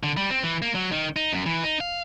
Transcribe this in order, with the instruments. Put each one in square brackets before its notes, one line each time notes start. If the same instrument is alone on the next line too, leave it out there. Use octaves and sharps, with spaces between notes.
[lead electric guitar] D3
G3
C4
E3
A#3
F#3
D#3
D#4
F#2
E3
D#4
F5